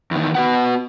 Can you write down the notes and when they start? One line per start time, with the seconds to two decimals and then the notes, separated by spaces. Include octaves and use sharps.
0.11 E2 D#3
0.35 B3 F#4 B4 F#5